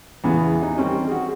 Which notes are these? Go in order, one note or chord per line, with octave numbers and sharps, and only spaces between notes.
E2 C#3 B3
D#4
D#3 G3 C4 C#4
F#4 G#4